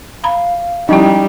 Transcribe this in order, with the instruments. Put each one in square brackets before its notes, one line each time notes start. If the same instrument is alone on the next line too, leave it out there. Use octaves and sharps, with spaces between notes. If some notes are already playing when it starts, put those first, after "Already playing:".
[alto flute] F5 [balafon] A#5 B5
[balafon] F3 C#4 E4 [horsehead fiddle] G3 [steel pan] D#4 [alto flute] G5